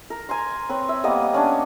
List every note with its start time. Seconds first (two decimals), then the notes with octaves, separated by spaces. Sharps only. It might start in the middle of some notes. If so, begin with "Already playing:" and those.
0.10 A#4
0.29 G#5 A#5 C6
0.69 C4 B4 C#5
0.89 E5
1.04 G3 A#3 B3 D#5
1.34 C#4 D4